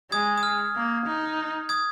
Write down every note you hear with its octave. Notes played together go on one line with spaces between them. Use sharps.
G#3 D#6 G#6
D#6
F6
A#3
D#4
D#6 G#6